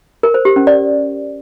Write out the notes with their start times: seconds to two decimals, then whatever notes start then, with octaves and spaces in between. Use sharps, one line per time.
0.23 A#4
0.34 C5
0.45 G4
0.56 C#4
0.67 D5